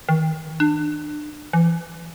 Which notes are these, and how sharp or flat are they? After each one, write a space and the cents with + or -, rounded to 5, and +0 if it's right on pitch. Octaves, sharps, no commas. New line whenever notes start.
D#3 +35
D4 +30
E3 +30